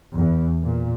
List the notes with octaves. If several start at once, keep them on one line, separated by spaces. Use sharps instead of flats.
E2
A#2